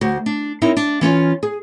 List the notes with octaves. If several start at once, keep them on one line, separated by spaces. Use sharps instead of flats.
D2 F#4 C5
D4
C4 D#4 E4 A#4 C#5
D4
E3 C#4 F4 C#5
G#4